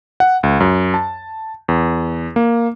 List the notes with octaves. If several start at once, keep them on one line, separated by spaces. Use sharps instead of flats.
F#5
C#2
F#2
A5
E2
A#3